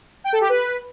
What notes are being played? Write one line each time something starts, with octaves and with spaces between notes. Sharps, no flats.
G5
A4
G4
B4